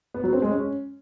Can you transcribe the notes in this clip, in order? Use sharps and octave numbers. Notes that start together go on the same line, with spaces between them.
B3
F#3
C4
G#3
C#4